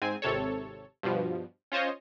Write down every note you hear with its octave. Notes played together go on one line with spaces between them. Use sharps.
G#2 C4 G#5
G#1 C3 A4 C#5
G2 B2 F3
C#4 F4 C5 C#5 D#5